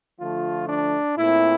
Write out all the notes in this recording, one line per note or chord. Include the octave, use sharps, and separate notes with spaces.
D3 F3 A3 F4
D4
A#2 A3 C4 E4